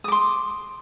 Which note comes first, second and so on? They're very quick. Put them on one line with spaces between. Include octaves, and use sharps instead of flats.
D#6 D6 C6